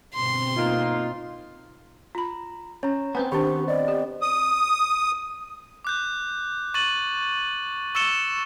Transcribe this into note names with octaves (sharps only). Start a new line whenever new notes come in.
G1 B2 C4 C6
A#3 D#4 F4
F4 A#5 B5
C#4 C#5 A#5
B3 C4 B4 G#5
D#3 D4 G4 C5 C#6
D5 D#5
G4
D#6
D6 F#6 G6
C#6 A6 D#7 F#7
C#6 E6 A6 C#7 E7 G7